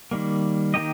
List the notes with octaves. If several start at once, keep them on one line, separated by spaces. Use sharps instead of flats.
D#3 G3 A#3
D#3 A#3 D#4 G4 D#5